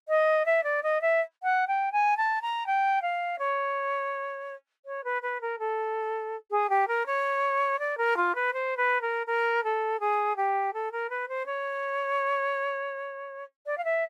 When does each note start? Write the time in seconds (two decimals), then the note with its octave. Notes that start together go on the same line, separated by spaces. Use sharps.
0.08 D#5
0.45 E5
0.63 D5
0.83 D#5
1.01 E5
1.43 F#5
1.67 G5
1.92 G#5
2.17 A5
2.42 A#5
2.66 G5
3.02 F5
3.39 C#5
4.85 C#5
5.04 B4
5.22 B4
5.41 A#4
5.59 A4
6.51 G#4
6.69 G4
6.87 A#4
7.06 C#5
7.79 D5
7.97 A#4
8.16 F4
8.35 B4
8.53 C5
8.77 B4
9.01 A#4
9.26 A#4
9.63 A4
10.00 G#4
10.36 G4
10.73 A4
10.92 A#4
11.09 B4
11.28 C5
11.46 C#5
13.66 D5
13.77 F5
13.84 E5